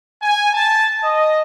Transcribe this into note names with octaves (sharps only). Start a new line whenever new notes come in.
G#5
A5
D#5